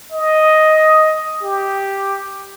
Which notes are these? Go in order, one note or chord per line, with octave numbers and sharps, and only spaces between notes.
D#5
G4